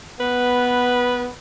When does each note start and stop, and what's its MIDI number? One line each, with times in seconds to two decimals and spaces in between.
0.20 1.26 59
0.20 1.35 71